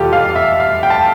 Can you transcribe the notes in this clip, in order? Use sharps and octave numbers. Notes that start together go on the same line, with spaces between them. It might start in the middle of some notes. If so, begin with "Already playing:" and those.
Already playing: F1 E2 B2 G3 F4 G4 A4
F5
E5
F5
G5
A5